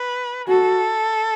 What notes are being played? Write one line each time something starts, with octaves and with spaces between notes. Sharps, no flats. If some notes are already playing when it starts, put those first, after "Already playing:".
Already playing: B4
F#4 A4